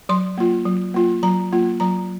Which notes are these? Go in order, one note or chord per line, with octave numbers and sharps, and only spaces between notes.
F#3 C6
A#3 F4
F#3
A#3 F4
F#3 A#5
A#3 F4
F#3 A#5